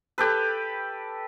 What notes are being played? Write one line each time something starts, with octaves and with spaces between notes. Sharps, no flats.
G4 A4 B4